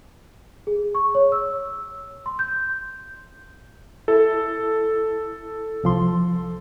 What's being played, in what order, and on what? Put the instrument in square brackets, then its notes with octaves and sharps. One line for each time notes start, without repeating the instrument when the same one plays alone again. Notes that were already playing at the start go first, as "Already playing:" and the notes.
[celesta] G#4
C#6
C#5
E6
C6
G6
[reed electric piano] E4 [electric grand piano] A4
[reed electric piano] C2 F3 C6